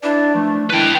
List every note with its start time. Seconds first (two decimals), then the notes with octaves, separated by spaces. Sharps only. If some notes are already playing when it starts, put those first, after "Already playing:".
0.03 D4 E4 B4 D5
0.35 F3 A3
0.70 D#3 G#3 D4 E4 B4 G5